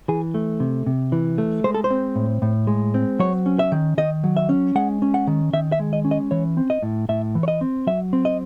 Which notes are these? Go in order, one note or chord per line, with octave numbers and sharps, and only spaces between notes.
E3 G#4
A3
C3
C3
E3
A3
G#3 C5
A4
C5
C4
A2
A2
G#3
C4
F#3 C#5
C#4
E5
D#3
D#3 D#5
F#3
E5
C#4
G#3 F#5
C#4
F#5
D#3
D#3 E5
E5
G#3
D#5
C#4
D#5
E3 C#5
C4
D#5
A2
A2 E5
E3
C#5
D#5
C4
F#3 E5
C4
D#5